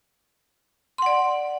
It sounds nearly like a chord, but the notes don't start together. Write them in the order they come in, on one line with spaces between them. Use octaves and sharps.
C6 F#5 D5